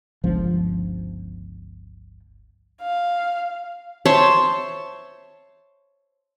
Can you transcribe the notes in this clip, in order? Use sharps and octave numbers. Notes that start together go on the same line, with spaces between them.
G1 C#2 F3
F5
C5 C#5 E5 A5